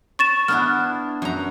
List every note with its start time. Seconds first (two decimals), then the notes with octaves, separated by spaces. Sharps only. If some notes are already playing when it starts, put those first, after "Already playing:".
0.19 C#6 A6 E7
0.48 B3 D4 E4 F6
1.22 F#2 A#5